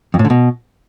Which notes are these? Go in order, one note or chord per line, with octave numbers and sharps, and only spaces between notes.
F2
A2
D3
B2